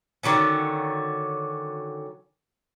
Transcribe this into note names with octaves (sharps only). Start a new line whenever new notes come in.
D3 D#3 F#3 C#4